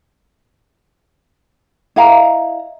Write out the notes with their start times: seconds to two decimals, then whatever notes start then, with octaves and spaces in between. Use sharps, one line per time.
1.96 E4 D#5 F5 A#5